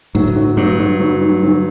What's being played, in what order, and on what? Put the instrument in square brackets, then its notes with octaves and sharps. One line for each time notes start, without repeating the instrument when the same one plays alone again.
[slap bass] A2 [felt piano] F#3
[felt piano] F#3
[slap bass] G2 [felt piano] F#3
[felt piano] F#3
F#3
F#3
F#3